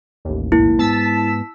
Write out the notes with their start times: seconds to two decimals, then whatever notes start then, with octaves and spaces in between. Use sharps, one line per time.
0.25 A1 D#2
0.52 B1 G#2 A#3 E4
0.79 G#2 G#3 B3 A5 E6 B6